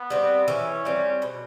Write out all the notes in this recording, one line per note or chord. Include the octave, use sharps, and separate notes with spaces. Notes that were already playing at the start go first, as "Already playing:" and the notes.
Already playing: B3
G3 C4
E3 C#4
G3 C4
B2